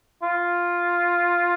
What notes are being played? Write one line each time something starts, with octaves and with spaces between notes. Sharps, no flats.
F4